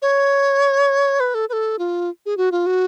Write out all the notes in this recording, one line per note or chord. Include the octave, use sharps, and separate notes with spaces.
C#5
B4
A4
B4
A4
F4
G#4
F#4
F4
F#4